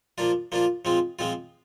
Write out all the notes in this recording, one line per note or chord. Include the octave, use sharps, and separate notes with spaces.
F3 A#3 D4 F4
F3 A#3 D4 F4
F3 G#3 C4 F4
F3 G#3 C4 F4